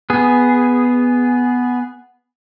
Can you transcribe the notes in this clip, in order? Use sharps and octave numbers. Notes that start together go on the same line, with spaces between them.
B3 G#4